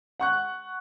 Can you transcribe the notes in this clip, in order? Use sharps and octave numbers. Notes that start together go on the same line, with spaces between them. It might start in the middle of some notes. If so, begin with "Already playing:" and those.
F#5 C#6 F#6